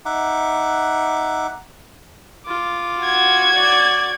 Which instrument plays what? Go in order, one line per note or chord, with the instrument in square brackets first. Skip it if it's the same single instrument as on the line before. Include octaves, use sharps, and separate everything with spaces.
[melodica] D#4 E5 F#5 D6
[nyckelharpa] F4 D6
[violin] F#4 G#6
[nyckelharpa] D5 D6